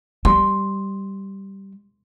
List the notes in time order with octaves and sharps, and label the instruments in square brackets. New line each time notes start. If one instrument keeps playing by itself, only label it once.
[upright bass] G3 [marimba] C6